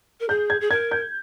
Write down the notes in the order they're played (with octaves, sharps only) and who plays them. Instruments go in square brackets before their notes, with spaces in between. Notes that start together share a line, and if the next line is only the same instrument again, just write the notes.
[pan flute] A#4
[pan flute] G#4 [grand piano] G6
[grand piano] G#6
[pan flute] G#4
[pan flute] A#4 [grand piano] G#6
[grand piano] G6